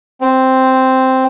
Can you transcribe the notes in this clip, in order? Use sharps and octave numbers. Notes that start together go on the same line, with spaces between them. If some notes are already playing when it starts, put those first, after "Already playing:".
C4